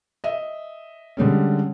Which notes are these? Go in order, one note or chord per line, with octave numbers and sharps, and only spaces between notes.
D#5 E5
D3 G3 G#3 C#4